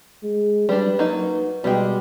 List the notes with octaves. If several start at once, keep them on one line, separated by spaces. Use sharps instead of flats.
G#3
G3 D4 B4
F#3 A#3 D#4
B2 G3 G#3 G5